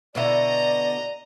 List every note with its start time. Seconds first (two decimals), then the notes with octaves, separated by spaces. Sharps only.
0.15 B2 D3 E4 D5 D#5 A#5